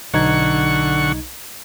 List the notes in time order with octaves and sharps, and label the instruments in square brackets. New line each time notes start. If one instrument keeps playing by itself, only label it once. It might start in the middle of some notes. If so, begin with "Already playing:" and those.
[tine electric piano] B1 D#4 G#6 [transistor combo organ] D3 F#5 C#6